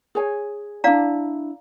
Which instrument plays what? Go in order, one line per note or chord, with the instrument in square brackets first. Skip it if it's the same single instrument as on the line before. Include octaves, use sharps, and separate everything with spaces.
[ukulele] G#4 C#5 G#5
[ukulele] D4 E4 [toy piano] D5 F5 A#5